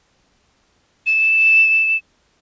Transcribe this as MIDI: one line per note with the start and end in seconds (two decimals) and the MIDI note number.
1.06 1.97 100